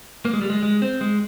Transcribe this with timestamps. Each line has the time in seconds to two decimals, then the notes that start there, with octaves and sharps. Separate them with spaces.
0.25 A#3
0.33 G#3
0.41 G3
0.50 G#3
0.63 G#3
0.82 C4
1.01 G#3